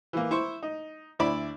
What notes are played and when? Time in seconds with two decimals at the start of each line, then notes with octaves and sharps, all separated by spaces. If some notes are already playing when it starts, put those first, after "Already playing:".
0.13 E3 A#3
0.31 E4 C5 C#6
0.63 D#4
1.19 D2 E4 D5 B5